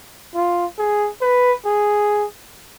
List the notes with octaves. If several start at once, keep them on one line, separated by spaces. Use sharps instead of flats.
F4
G#4
B4
G#4